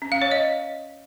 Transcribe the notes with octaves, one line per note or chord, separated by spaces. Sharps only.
C#4
F5
C#5
D#5